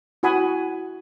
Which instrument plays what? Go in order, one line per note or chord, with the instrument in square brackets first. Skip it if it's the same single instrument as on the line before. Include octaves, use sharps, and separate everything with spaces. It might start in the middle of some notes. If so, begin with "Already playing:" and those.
[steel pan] E4 F#4 F#5 G#5 B5 D#6